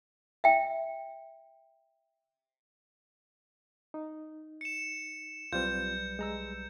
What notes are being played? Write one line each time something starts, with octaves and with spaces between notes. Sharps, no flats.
E5 G5
D#4
C#7 E7
B1 G3 C4 F4 B4 G6
G#3 A#5 E6